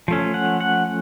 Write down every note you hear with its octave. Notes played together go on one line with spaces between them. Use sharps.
F3 A3 C#4
F#5
F#5